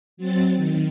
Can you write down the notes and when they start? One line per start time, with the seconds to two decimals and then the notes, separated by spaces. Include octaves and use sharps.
0.17 F#3 C4 A6
0.55 D#3